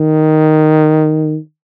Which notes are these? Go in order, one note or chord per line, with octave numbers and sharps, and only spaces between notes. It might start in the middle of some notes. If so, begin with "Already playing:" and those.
Already playing: D#3